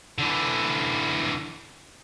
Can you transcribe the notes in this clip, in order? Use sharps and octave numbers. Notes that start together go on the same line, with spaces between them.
D3 E3